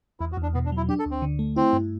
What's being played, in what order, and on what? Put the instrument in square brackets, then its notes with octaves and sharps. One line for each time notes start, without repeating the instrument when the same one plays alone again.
[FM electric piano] E2 [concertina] E4
[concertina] F#4
[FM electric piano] E2
[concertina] D4
[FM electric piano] B2 [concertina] B3
[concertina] D4
[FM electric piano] F#3 [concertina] E4
[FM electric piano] D4 [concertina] G4
[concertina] A4
[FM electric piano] D2
[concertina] C4
[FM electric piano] D3
A3
[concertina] C4 [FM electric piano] E4
[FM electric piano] G2